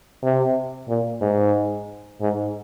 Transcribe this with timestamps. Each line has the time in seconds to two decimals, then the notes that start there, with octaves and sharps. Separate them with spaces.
0.23 C3
0.88 A#2
1.21 G#2
2.21 G#2